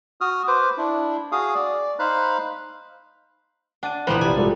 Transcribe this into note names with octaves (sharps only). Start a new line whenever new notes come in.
F#4 D#6 F6
B4 C5 D6
D4 E4
F#4 G#4 F5 D#6
D5
D#4 C5 F5 B5 F#6
D4 F#5 D#7
A#1 E3 G3 A#3 B3 C5 F5 F#6
C2 G4 D5 G#5
G#2 F3 G3 F#4 G4 A4